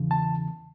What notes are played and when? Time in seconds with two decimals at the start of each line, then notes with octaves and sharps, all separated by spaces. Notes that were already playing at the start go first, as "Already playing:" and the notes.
Already playing: E2 C#3 E3
0.11 A5